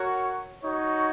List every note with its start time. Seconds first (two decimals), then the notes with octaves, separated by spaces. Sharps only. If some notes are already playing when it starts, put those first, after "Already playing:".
Already playing: F#4 A#4 C#5 F#5
0.63 D#4 F#4 C#5